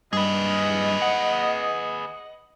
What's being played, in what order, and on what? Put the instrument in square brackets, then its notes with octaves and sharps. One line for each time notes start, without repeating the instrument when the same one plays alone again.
[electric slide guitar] G2 [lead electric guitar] G#4 B4 [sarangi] D#5
[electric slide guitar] F#5